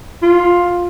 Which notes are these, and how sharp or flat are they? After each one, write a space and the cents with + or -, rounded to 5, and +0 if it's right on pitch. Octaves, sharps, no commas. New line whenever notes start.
F4 +10